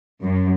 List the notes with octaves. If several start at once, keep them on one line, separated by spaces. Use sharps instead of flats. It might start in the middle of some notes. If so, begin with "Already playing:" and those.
F#2